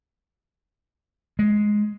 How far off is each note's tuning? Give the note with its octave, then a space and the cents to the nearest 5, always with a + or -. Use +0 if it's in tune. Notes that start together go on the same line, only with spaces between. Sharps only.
G#3 +5